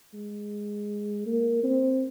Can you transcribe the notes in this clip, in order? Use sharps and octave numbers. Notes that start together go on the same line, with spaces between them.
G#3
A#3
C4